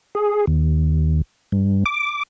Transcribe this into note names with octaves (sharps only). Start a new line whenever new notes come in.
G#4
D#2
G2
D6